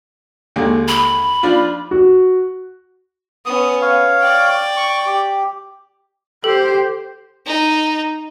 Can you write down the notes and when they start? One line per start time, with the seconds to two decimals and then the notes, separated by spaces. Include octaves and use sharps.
0.56 D#2 D3 G#3
0.88 B5
1.43 F3 D4 F4
1.91 F#4
3.46 B3 C#4 D#6
3.82 C#5 F5
4.20 D5 G5
4.77 C#6
5.06 G4
6.44 G4 A4 C5
7.47 D#4